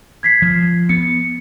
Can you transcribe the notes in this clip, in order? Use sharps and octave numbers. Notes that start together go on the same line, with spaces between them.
G#6 B6 C7
F3
B3 C#7